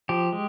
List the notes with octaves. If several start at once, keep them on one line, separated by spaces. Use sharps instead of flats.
F3 G4
G#3